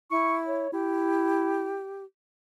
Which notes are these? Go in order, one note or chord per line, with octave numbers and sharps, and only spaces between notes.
E4 C#6
C#5
E4 G4